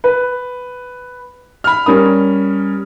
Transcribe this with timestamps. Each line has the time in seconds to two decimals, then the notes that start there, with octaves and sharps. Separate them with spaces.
0.04 B4
1.64 B5 F6
1.86 G3 C#4 A#4 D#6